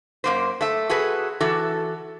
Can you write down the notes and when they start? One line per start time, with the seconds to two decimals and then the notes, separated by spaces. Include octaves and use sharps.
0.24 F#2 A#3 C5
0.61 A3 E5
0.89 F#4 G#4 A4 B4
1.41 E3 F#4 A4